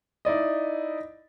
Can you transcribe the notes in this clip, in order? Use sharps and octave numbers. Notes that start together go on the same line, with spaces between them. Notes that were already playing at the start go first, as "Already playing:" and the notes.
D#4 E4 D5 D#5